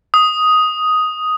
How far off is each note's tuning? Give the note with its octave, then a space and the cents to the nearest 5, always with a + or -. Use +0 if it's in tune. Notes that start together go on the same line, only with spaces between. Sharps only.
D#6 +5